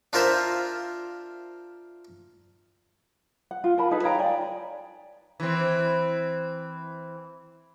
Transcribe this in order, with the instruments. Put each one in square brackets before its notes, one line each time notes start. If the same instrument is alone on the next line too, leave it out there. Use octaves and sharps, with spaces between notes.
[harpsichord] D4 F4 A#4 C5 E5
[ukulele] F#5
F4
A#4 A5 B5
D#4 G#4 A4 B4
C#5 F5 G5 A#5
D5 G#5
[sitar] E3 C4